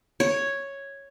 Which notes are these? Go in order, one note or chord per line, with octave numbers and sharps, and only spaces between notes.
C#5